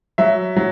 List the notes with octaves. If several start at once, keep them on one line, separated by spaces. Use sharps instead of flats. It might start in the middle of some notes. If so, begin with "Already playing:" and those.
F#3 E5
F#3